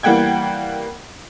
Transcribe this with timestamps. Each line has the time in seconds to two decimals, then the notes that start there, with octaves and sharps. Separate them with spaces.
0.03 E3 G3 A#3 F#5 G5 G#6